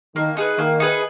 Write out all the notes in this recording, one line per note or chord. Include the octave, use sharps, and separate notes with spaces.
D#3 A#3
D#4 G#4 B4
D#3 A#3
D#4 G#4 B4